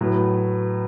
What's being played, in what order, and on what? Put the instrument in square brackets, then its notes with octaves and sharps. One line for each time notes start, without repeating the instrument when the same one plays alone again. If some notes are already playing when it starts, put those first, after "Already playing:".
[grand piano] A2 F#3 B3